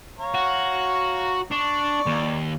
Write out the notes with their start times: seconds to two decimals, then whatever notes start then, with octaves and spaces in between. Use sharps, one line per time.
0.19 C#5 F5 A#5
0.34 F#4
1.51 D4 D5 C#6
2.06 D#2